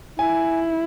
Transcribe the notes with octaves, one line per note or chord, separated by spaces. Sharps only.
E4 G#5